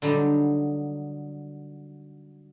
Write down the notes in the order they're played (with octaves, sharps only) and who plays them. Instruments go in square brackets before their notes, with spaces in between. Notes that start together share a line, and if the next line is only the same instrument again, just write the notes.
[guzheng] D3 F#3 G3 D#4